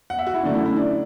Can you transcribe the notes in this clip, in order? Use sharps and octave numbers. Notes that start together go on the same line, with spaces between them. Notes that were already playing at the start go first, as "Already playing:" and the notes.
F#5
E5
F#4
E4
F#2 D3 A3 D4
E4
E4
D4